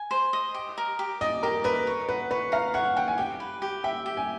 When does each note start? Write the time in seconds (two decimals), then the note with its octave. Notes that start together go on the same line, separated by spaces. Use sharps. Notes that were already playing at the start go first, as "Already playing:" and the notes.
Already playing: G#5
0.11 C5
0.33 D#5
0.54 G4
0.78 A#4
0.99 G4
1.21 D5 D#5
1.43 G4 A#4
1.64 A#4 B4
1.87 C#5
2.09 B4 F#5
2.31 B4 C#5
2.52 F5 A#5
2.74 C#5 F#5
2.96 F#5 G5
3.08 G#5
3.18 G4 G5
3.40 B4
3.62 G4
3.84 E5 G5
4.06 G4
4.17 G#5